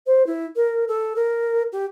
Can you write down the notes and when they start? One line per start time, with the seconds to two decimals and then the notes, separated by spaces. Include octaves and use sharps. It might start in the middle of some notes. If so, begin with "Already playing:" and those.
0.06 C5
0.26 E4
0.56 A#4
0.88 A4
1.16 A#4
1.72 G4